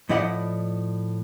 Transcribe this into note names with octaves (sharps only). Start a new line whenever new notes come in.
A2 F3 E4 D5 D#5 F#5